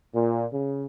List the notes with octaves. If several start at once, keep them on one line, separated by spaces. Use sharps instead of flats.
A#2
C#3